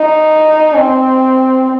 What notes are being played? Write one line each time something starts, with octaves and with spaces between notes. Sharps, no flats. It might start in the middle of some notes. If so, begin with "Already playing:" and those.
Already playing: D#4
C4